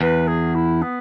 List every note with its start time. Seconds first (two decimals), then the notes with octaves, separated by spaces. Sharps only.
0.01 E2 B4
0.27 G#4
0.55 E4
0.81 B3